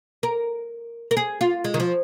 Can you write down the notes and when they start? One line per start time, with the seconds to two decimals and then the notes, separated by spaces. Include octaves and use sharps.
0.23 A#4
1.11 A#4
1.17 G#4
1.41 F4
1.64 G#3
1.74 D#3
1.80 F3